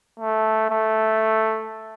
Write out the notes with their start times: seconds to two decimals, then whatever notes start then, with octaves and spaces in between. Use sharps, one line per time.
0.20 A3
0.70 A3